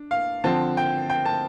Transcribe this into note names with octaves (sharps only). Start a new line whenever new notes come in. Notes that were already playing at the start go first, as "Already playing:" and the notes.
Already playing: D4
F5
D3 F3 C4 A5
G5
G5
A5